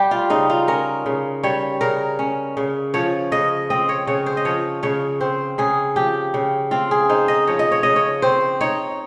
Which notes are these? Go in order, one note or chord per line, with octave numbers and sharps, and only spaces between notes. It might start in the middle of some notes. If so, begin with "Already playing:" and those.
Already playing: G3 G4
F4
C#3 D#4
F4
C#4 A#4
C#3
G3 C#5
C#3 A#4
C#4
C#3
F3 C#5
C#3 D#5
C4 D#5
C#5
C#3 C#5
C5
D#5
F3 C#5
C#3 C#5
C4 C5
C#3 G#4
F3 G4
C#3
C4 F4
G#4
D#4 C5
D#5
F3 C#5
D#5
C#5
C#3 D#5
C#5
C4 C5
D#4 C#5